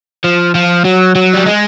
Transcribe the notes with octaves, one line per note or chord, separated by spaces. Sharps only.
F3
F3
F#3
F#3
G3
G#3